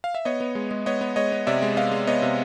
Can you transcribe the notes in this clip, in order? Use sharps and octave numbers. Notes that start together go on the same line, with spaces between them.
F5
E5
B3 C#5 D#5
B3
G#3
G#3
B3 C#5 D#5
B3
G#3 C#5 D#5
B3
C3 D5 E5
G#3
B3 D#5 F5
G#3
B3 C#5 D#5
C3